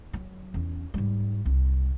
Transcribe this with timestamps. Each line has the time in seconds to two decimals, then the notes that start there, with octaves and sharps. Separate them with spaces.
0.13 F#3
0.54 E2 C#4
0.94 G#2 G3
1.46 C2